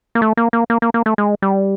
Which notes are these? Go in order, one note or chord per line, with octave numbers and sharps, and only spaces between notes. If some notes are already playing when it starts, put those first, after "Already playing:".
A#3
A3
A#3
A#3
A#3
A#3
A#3
A3
G#3
G3